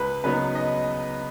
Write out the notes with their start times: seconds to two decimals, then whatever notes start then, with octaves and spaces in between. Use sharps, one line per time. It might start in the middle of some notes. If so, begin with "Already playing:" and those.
Already playing: C#2 B4
0.24 C#3 F#3 B3 D#4 B4
0.55 D#5